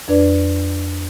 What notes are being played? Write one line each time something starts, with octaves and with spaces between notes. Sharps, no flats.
F2 D4 B4 D5